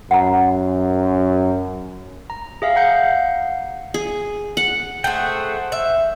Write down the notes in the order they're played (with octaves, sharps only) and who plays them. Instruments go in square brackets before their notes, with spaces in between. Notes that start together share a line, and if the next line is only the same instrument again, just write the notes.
[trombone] F#2 [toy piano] F#5 A#5
[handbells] A#5
G#4 E5 F5
F5 F#5 A#5 G6 C#7
[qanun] G#4
F#5
[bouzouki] A3 G#4 [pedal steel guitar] C5 F#5 G5
[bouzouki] E5